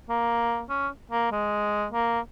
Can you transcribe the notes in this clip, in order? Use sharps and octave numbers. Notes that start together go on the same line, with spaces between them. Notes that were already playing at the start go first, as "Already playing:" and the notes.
A#3
C#4
A#3
G#3
A#3